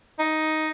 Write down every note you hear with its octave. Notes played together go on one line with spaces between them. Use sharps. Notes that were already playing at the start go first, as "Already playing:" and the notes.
D#4